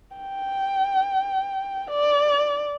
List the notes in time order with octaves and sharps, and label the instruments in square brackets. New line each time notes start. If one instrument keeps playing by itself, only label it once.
[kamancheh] G5
D5